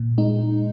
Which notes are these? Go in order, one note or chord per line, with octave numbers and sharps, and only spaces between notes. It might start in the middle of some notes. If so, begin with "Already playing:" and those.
Already playing: A#2
G#3 D#4